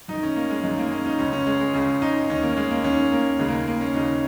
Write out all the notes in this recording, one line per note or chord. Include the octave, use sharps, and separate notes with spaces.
F#2 D#3 D#4
C#4
A#3
G#3
F#2 D#3 G#3
A#3
C#4
D#4
C#2 C#3 C#4
C#4
G#3
G#3
C#2 C#3 C#4
D#4
D#2 D#3 C#4
A#3
G#3
A#3
D#2 D#3 C#4
A#3
D#2 C#3 G#3
A#3
G#3
A#3
C#4
D#2 C#3 D#4